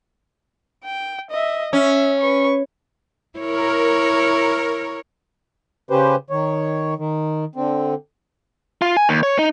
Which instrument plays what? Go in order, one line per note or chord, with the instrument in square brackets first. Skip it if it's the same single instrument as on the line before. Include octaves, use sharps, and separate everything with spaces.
[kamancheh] G5
D#5 E5
[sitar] C#4 [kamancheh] E5
[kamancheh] B4 C#6
[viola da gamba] E4 C#5 [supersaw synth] A#4
[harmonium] C#3 C#4 G4 B4 C5
D#3 C#5
D#3
D3 C4
[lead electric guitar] F4
G#5
D#2
C#5
D#4